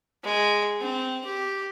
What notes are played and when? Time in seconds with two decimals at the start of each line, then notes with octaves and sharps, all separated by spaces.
0.24 G#3
0.81 C4
1.25 G4